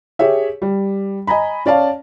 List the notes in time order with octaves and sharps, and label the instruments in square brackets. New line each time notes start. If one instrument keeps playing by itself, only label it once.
[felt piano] G4 G#4 C#5 E5
G3
D#5 G#5 A#5 B5
C#4 D5 F5 A5